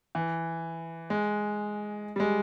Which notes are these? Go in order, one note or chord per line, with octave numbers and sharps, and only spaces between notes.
E3
G#3
G3
G#3